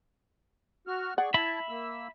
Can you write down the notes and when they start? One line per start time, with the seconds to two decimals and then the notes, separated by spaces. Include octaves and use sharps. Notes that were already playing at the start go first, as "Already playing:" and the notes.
0.87 F#4 F6
1.18 G#4 D5 F#5 C#6
1.34 E4 E5 A5 B5
1.69 A#3 E6